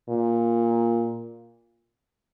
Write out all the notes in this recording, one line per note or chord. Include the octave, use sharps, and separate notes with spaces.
A#2